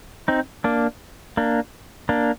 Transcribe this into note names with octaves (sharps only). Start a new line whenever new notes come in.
C4 D#4
A#3 D4
A#3 D4
A#3 D4